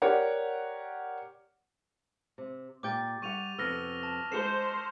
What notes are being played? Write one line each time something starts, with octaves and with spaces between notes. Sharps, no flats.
G4 A#4 C#5 D5 F#5
C3
A#2 G4 G5 D6 G6 A6
G3 G4 F#5 C#6 D#7 F7
F2 C3 B3 E6 F6 A#6
A5
G#3 C5 C7 C#7 E7 G7